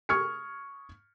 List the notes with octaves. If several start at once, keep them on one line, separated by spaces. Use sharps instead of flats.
C#6 D#6 F6 G#6 C#7